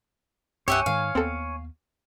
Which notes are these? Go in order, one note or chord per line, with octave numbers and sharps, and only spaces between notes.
C2 G2 G4 C#5 E5 F#5 G#5
G#2 D#3 G#3 F5
D#2 B3 C4 A4